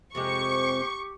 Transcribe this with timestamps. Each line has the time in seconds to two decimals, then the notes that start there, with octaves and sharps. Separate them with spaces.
0.15 F2 C3 G#3 G4 C#6